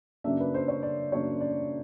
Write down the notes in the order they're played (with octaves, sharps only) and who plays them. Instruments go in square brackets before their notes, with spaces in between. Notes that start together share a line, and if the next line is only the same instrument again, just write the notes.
[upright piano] F#2 C#3 F#3 A#3 D4 E5
B4
C5
C#5
D5
F#2 C#3 F#3 A#3 D4 C#5
D5